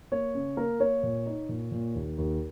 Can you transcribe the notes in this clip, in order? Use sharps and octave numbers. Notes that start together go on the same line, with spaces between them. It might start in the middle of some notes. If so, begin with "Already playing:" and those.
A#3 C#5
C#3
A#3 A#4
A#3 C#5
A#2
D#4
A#2
A#2
D#2
D#2